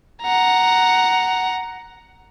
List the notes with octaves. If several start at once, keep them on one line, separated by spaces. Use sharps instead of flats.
F#5 A#5